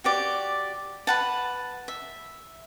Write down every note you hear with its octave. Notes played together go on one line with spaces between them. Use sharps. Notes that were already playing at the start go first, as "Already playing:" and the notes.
F#4 G4 D5
B4 F#5 A5
E5